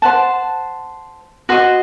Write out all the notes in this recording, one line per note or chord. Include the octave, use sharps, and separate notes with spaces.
C5 F#5 A5
F#4 C5 D#5